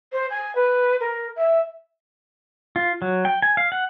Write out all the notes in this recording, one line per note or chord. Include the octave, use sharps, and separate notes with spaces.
C5
G#5
B4
A#4
E5
F4
F#3
G5
G#5
F5
F#5